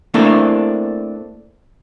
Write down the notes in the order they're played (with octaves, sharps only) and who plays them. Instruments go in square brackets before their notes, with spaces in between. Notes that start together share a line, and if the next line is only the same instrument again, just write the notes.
[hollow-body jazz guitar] A3 A#3 C4 D4 E4 A4